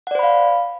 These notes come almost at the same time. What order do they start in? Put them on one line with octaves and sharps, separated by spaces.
F#5 D5 C5 B5 F5